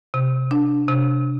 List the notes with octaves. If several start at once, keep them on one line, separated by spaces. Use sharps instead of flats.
C3
D4
C3